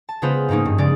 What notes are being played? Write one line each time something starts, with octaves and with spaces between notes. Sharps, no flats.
A5
C#3 G#3 B3 F4 B4 C5
G#2 F3 A#3 C#4 D#4
G2
C#3 G#3 D5